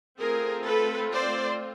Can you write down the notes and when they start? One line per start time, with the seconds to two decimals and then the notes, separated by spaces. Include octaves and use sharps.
0.18 A3 C4 F4 G#4 A#4
0.65 A4 B4
1.11 C5 D5